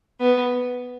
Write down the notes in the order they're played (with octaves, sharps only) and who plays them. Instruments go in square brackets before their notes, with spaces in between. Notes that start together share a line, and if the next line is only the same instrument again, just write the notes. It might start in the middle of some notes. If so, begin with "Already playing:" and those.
[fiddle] B3